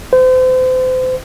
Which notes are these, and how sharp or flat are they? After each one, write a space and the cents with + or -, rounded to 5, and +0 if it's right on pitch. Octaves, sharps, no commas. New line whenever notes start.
C5 -35